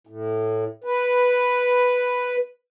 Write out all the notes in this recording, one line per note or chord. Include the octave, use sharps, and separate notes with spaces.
A2
B4